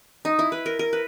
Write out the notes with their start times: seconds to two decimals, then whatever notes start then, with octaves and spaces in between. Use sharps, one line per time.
0.25 D#4
0.39 E4
0.52 B4
0.66 A#4
0.79 A#4
0.93 B4